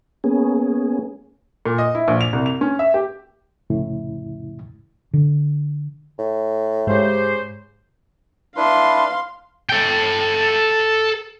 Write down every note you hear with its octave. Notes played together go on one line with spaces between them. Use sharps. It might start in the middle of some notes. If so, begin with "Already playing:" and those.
A#3 B3 C#4 G#4
A#2
D#5
E4
A#1
F7
C2
F7
C#4
E5
G4
C2 F2 A2 C#3 E4
D3
A2
G#2 C#3 G#3 G4 C5
D4 E4 B4 F5 C6
A4 G5